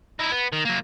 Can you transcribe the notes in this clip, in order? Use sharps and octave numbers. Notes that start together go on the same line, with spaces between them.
D#4 E4
B3
D#3
F#3 A#3